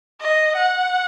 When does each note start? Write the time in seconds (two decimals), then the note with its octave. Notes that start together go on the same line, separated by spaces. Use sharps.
0.20 D#5
0.56 F#5